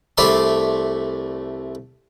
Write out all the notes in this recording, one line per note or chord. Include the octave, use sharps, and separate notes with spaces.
C2 A3 D5 B5 C6